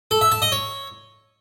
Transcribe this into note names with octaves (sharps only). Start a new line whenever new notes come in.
A4
E5
A5
D#5
C#5